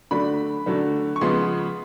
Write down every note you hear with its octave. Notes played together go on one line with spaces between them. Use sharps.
D3 F#3 A3 D4 B5
D3 F#3 A3 D4
C#6
C#3 F3 G#3 B3 C6